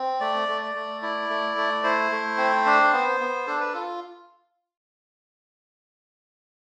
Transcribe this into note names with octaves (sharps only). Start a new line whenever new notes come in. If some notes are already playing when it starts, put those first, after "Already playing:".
Already playing: C4
A3 D5
A3
D5
A3
E4 D5
A3
A3
E4 C5
A3
C4
D4
B3
B3
D4 A4
B4
F4 A4